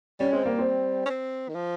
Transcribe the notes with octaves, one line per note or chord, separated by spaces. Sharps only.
G3 C#4
G#3 C4
G3 A#3
C4
C#4
C4
D#3
F3